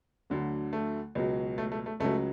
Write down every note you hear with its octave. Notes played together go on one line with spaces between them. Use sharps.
D2 D3 F#3
A3
C#2 B2 F#3
A3
A3
A3
C#2 C#3 F#3 A3